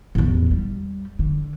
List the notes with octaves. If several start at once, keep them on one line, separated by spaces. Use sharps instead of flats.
A1 E2
G3
D3